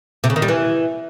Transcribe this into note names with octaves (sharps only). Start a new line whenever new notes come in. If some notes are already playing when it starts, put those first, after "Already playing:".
C3
C#3
D#3
G3
E3